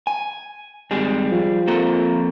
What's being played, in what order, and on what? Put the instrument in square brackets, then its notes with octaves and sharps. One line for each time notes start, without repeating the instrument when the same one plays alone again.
[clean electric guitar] G#5
[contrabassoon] G#1 [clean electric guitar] G3 G#4
[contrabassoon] F3
[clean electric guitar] A#3 C4 A4